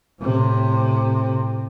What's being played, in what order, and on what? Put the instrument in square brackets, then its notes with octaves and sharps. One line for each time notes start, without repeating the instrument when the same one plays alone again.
[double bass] A2 C3